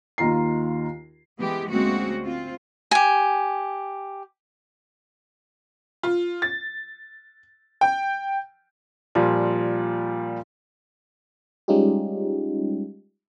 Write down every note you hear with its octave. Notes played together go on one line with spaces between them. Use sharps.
D#2 D#3 F4 A#5 C7
E3 G#3 B3 G4
D2 G#3 A#3 C4 C#4 F#4
C4 F4
G4 G#5
F4
A6
G5
A#2 F3 G3 F4
G3 G#3 C#4 D#4 F4 G4